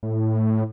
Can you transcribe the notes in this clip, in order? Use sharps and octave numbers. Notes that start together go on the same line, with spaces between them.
A2